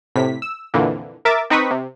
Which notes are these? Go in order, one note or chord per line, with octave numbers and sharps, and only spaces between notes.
A2 C3 B6
E6
F2 A#2 D3 E3
A#4 E5 D6 A6
C4 D#4 B4 C#6 D#6 B6
C3